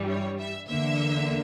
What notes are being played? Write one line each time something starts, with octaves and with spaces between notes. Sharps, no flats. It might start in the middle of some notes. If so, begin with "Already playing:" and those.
Already playing: G2 E3 G3
C#5
E5
E2 D3 A#3 E5